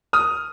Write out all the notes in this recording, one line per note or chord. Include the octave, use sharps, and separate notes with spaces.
D#6 F6